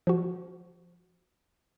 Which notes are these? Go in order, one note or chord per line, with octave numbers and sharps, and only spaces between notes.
F3 F#4